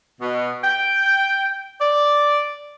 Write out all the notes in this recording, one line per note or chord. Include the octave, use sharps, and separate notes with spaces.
B2
G5
D5